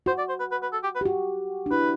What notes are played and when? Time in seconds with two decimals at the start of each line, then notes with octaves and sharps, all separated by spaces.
0.06 F#4 C5
0.18 D5
0.29 C5
0.39 B4
0.51 B4
0.62 B4
0.73 A4
0.83 G4
0.95 B4
1.01 G4
1.06 F#4
1.66 D4
1.71 E4 B4